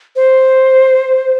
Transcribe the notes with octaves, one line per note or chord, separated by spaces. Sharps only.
C5